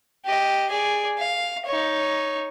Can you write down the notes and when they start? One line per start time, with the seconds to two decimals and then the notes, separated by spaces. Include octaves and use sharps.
0.25 G4 D#5
0.69 G#4 D5
1.18 F5
1.66 D#4 C#5